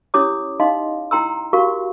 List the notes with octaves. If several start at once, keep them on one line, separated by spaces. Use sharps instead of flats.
C#4 E4 G4 C#5 D6 D#6
D#4 D#5 F5 C6
E4 G5 A#5 C6 E6
F#4 G4 A#4 F5 C#6